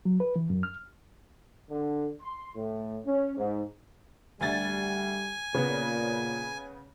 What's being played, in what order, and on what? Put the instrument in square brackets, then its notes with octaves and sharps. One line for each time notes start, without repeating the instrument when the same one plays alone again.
[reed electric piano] F#3
B4
E3
F#2
F6
[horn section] D3
C6
A2
C#4
G#2
[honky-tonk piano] D2 A6 [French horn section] G3 [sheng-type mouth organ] G#5
[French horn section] A#2 [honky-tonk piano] C#3 B3